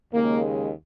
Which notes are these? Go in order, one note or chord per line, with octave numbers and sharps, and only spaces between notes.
D#2 C#3 G#3 A#3